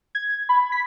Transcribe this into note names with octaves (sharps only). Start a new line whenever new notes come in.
G#6
B5
B6